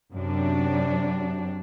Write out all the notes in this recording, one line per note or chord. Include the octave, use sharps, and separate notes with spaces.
F#2 C3 D4